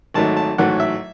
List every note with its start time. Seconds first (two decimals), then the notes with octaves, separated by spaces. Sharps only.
0.14 G#1 G#2 F#3 A3 A5
0.37 A5
0.58 A1 G#2 F#3 A3 F#5
0.80 E5